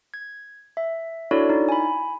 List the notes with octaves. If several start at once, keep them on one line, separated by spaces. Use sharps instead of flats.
G#6
E5
D4 E4 F#4 A4 C#5 D5
D#4 E4
G#5 B5